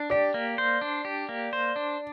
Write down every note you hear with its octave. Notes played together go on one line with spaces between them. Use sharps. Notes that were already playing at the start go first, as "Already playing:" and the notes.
Already playing: D4
G4 D5
A#3
C5
D4
G4
A#3
C5
D4